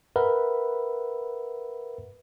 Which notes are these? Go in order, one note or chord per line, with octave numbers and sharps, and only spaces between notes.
A#4 B4 E5 F#5 B5